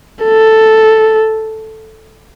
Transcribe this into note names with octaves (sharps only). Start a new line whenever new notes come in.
A4